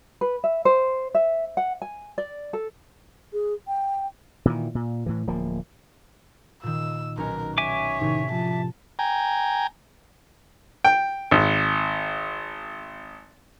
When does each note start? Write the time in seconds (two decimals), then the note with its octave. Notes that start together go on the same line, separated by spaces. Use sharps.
0.21 B4
0.44 E5
0.65 C5
1.15 E5
1.57 F#5
1.82 G#5
2.18 D5
2.53 A4
3.33 G#4
3.67 G5
4.45 A#2 D#3 E3
4.75 A#2
5.06 A2 E3
5.27 D1 F3 A#3
6.63 A#2 D#3 E6
7.17 B1 C#4 A#4
7.58 C#5 E5 G#5 D6
8.01 A2 C3 D#3
8.32 F3 A5
8.99 G5 G#5 A#5
10.84 G5
11.31 G#1